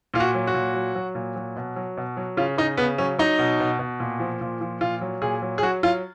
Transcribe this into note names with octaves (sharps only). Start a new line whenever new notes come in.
A#2 F4
F#4
F#3
F#4
A#2
F#3
F#3
A#2
F#3
B2
F#3
B2
F#3
C#3 F4
C#3 D#4
C#3 B3
F#3 C#4
F#3 D#4
B2
B2
B2
A#2
F3
A#2
F3
A#2 F4
F#3
A#2 G#4
F#3
G#4
F#3 F#4
F#3 F4